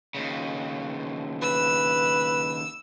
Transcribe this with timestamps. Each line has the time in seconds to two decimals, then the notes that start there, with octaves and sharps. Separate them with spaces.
0.15 D#2 C#3
1.42 B4 E6